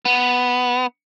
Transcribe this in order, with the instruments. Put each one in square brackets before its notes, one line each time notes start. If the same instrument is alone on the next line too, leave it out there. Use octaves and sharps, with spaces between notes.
[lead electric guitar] B3